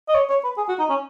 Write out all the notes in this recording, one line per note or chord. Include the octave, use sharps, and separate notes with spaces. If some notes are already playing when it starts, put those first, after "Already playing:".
D#5
C#5
C#5
B4
G#4
F#4
D#4
C#4